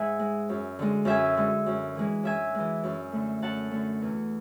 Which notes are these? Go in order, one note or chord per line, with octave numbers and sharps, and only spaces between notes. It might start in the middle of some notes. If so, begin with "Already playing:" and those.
Already playing: G#2 E5 F#5 G#5
G#3
F#2
D3 G#3
F#2 E5 G#5
D3 G#3
F#2
E3 G#3
F#2 E5 G#5
E3 G#3
F#2
D3 A3
F#2 F#5 A5
D3 A3
E2